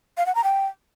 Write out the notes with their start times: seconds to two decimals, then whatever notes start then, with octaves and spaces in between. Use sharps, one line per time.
0.18 F5
0.26 F#5
0.35 A#5
0.44 G5